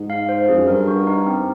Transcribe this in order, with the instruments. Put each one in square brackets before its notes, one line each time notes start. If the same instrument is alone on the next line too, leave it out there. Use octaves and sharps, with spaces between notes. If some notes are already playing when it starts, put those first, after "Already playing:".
Already playing: [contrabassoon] G#2
[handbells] F5
C5
[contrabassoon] F2 [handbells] G#4
[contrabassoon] F#2
[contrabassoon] G2 [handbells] A#4
[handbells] F#4
D#4
C4